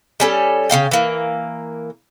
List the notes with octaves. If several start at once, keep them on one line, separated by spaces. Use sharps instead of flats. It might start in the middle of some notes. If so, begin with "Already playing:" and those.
G3 C#4 A4
C#3 C4 F5 G5
E3 A#3